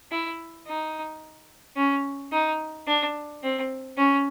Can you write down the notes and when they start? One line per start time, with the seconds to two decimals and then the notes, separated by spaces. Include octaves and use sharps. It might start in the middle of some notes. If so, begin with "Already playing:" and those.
0.11 E4
0.67 D#4
1.77 C#4
2.32 D#4
2.87 D4
3.43 C4
3.98 C#4